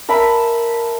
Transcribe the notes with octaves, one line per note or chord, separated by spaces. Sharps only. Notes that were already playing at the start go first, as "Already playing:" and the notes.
A#4 E5 A5 B5